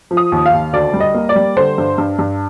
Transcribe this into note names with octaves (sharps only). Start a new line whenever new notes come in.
F3
D#6
D#2
F5
D#2
D2 D5
G3
D#5
A#3
D5
G3
D3 C5
G2
G2
G2